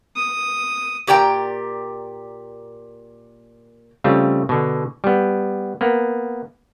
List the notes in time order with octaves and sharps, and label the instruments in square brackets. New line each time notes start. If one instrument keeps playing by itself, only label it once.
[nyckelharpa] D#6
[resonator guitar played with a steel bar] A#2 G4 D5 G5 A#5
[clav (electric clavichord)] C#3 G3 A3 C4 F4
B2 D3
G3 B3
A#3 B3